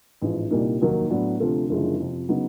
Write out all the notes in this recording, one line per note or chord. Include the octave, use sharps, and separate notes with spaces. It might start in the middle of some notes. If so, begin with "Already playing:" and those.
A1 G#2 F3
C2 A#2 G3 A#3 D#4
F1 D#2 D#3 F#3 A#3
A2 F#3 B3 D4
D2 C3 F3 A3
F#1 F#2 D3 F3 G#3
F2 C3 F3
C#3 F#3 B3 D#4